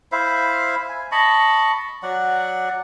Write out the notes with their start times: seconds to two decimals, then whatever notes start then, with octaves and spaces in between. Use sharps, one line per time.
0.12 E4 C5 E5 F5
0.89 G#5
1.12 D#5 A5 B5 C#6
2.03 F#3 D5 F#5